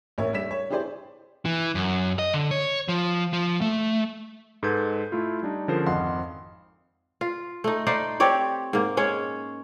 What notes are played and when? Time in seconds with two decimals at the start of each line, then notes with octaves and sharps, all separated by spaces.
0.18 A1 A#3 C#5 E5
0.33 G3 D4 E5 B6 E7
0.51 C#5
0.70 D4 E4 G4 G#4 C5 D5
1.45 E3
1.75 F#2
2.19 D#5
2.33 D3
2.51 C#5
2.89 F3
3.33 F3
3.61 A3
4.63 G#2 G#3 A4 B4 G6 G#6
5.12 A3 E4 F4
5.43 G3 D4 D#4
5.68 D3 F3 C#4 G#4 A#4 C5
5.86 G#1 F2 D#5 F5 F#5 C6
7.21 F4
7.64 A3 D#4
7.86 D#4 C5 D5 F5
8.20 C4 G4 C#5 D5
8.73 G#2 A#3
8.97 G#3 C#4 C#5